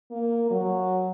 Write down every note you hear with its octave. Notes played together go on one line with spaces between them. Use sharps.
A#3
F#3